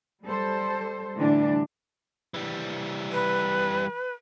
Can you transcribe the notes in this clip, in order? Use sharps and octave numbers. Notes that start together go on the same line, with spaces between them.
G3 A4 C5
A2 D3 E3 G3 D4
E3 G3
B4